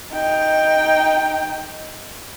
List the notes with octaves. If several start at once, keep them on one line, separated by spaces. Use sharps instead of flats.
D#4 G5